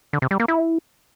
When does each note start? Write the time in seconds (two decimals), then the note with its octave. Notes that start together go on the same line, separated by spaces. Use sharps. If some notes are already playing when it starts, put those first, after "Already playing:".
0.13 D3
0.22 C3
0.31 G3
0.40 A#3
0.48 E4